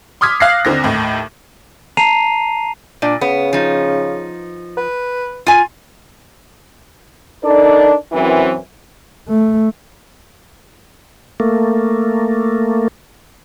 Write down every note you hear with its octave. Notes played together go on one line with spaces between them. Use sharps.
C6 D6 D#6 F6 G#6 B6
F5 F#6 A#6 C7
D#2 D3 C4 A#6
D#2 A2
A5 A#5 C7 D#7 F7
A#2 D4
C#3 B3
F3 D#4
B4
F4 G#5
D4 D#4 A4 A#4 D5
F#2 E3 C4
A3
A3 A#3